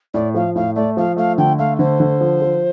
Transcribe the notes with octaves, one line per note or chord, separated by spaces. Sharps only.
A2 D5
F3 F5
A2 F5
A3 D5
F3 F5
A3 F5
D3 G5
A3 F5
D3 C5
D3
F3
F3